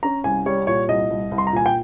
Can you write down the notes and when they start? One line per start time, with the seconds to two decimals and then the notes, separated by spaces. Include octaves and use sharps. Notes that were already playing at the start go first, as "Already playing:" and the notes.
0.03 C#4 A#5
0.24 C2 G#5
0.46 G3 C#5
0.67 A#2 C#5
0.89 C2 D#5
1.10 C2
1.31 C2
1.38 C6
1.47 A#5
1.53 A#2 G#5
1.66 G5